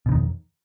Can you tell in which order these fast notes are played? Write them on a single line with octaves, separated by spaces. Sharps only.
B2 D3 D#3 F2